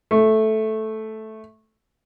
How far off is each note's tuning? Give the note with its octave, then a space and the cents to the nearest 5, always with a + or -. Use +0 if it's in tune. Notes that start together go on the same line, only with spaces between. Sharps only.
A3 -5